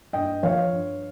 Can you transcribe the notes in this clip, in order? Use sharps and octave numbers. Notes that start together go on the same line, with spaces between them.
G2 D#5 G5
F3 C#5 F5
G2